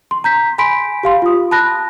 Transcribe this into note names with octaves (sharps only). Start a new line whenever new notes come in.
C6
A#5 G6 B6
G#5 B5 C6 B6 D7
G4 F5 C6
F4 D#6
A5 B5 F#6 A#6